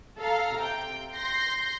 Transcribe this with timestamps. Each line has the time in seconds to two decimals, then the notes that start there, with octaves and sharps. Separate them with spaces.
0.19 A4 F5 A#5
0.58 C3 G5
1.14 C6 G6 A#6 C7